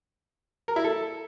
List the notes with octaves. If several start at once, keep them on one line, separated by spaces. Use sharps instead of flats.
A#4
E4
A4